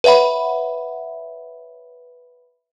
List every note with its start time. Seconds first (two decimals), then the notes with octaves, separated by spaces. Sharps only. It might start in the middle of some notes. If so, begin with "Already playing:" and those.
0.04 B4 C#5 E5 F#5 B5